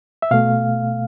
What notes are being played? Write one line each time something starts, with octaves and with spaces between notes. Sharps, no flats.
E5
B2 A3 F5